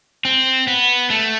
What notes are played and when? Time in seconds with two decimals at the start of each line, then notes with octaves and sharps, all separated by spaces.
0.25 C4
0.68 B3
1.10 A3